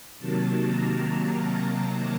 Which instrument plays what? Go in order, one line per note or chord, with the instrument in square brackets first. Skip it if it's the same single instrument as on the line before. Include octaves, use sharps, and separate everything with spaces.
[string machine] C3 D#3 F#3 A#3 A5
A#5
A5